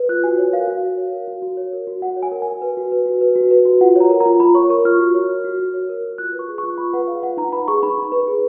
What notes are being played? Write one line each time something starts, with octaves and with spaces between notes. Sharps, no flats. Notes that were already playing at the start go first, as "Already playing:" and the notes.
Already playing: B4
F4 F#6
F#4 G#5
C#5
A#4 F5
F#4
F#4
C#5
A#4
F#4
F#4
C#5
A#4
F#4
F#4 F#5
C#5
G#5
A#4
G#5
F#4
B4
F#4
B4
F#4
B4
F#4
B4
F#4
F4 F#5
C#5 A#5
A#4
A#5
F4
F4 B5
C#5 C#6
A#4 C#6
F4 F6
F#4
C#5
A#4
F#4
F#4
C#5
A#4
F#4
F4 F#6
B4
C#6
G#4
C#6
F4
F4 B5
B4 F#5
G#4 F5
F4 F#5
D#4 A#5
B4 B5
G#4 C#6
D#4 B5
D#4
B4
G#4